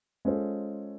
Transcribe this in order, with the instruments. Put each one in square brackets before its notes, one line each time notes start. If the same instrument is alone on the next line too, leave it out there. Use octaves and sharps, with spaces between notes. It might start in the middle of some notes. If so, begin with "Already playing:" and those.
[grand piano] G#3 C#4 F4 A4 C5